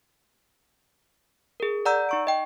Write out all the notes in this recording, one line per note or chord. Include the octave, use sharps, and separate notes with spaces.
G#4 A#4
D5 F#5 A#5 E6 G6
D#4 C#6 D7
D#5 G5